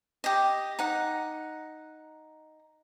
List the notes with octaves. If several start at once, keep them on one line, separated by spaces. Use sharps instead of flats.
G4 D#5
D#4 F#5